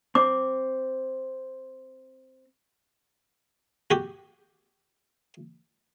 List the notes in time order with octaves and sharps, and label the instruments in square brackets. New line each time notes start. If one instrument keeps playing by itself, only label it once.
[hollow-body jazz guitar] C4 [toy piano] D6
[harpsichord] F#4 G4